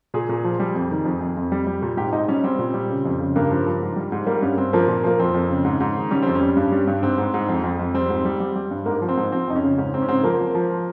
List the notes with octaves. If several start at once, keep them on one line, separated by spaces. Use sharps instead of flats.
A#2 G#4
A#2
F3
G3
F2
D#3
F2
F2
F2
G3
G3
A#2
G#2 G4
G#2 D#4
G3 C#4
G3 C4
A#2
G3
C#3
F2
C#3
G2 A#3
F3
F3
G#2
G3
G#2
G3 A#3
G2 C#4
G2 C4
F3 A#3
A#2
F3 A#3
F2 C4
F2
C#3
G#2
G#2
D#3
G3 C#4
F2 C4
C#4
G3
G2
G3
G2
G#2 C4
G#2
G#2
F2
F2
F2
G3 C4
G#2
G3
G3
G3
G2
G#2 A#3
F3
C4
G#2
F3 C4
F2 D#4
C#4
C#3
G#2 C#4
G#2 C4
C#4
G#2 C4
F3 A#3
F3
F3